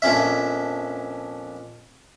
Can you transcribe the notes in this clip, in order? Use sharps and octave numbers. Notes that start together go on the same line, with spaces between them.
A#1 F2 C#4 E5